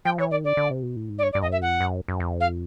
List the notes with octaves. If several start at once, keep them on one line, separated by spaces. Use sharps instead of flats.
F3 G5
E3 C#5
D#3 D5
D3 D5
D3
C3
B2
A2
G#2
D5
G2 C#5
D5
G2
F2 D#5
F#2 E5
F2 F#5
F#2
F#2
F2
F5